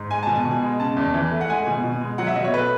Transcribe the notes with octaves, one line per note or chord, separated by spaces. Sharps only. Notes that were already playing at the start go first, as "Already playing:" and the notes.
Already playing: G#2
G#3 G#5
B2 A5
G#5
B2
G#3
C#3 A5
E2
E3
A3
F#5
G#3 G#5
B2
B2
G#3
F#3 F#5
E5
B2 D#5
C#5
A3 B4